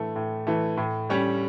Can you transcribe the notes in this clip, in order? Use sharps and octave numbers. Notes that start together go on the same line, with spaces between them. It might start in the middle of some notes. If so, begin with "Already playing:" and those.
Already playing: A2 E3 A3
A2
E3 A3
A2
G3 C#4 G4